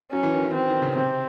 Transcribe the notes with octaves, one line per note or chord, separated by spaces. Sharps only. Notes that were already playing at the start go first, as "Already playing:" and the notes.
F#3 C#4
E3
D#3
E3
E3 C4
D#3
C#3
C3 C4